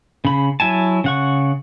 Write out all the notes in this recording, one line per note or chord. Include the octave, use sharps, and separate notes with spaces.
C#3 B5
F#3 E4 G#5 A5
C#3 F#5 C#6